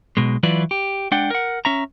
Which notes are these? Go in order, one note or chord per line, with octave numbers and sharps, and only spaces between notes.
B1 B2 G#3
E3 F#3 E4 F4 B4 D5
G4
G#3 D4 D5 F#5 G5
A#4 F#5
C#4 E5 A#5